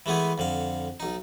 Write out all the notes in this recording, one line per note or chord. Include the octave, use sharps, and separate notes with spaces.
E3 G#3 A3 B3 G#4
F2 D3 F5
B1 D#4